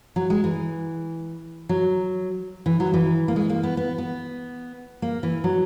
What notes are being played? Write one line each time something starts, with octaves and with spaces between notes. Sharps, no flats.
F#3
G#3
E3
F#3
E3
F#3
E3
A#3
G#3
A#3
B3
B3
B3
A#3
E3
F#3